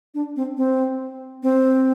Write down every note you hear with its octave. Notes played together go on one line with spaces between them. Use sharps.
D4
C4
C4
C4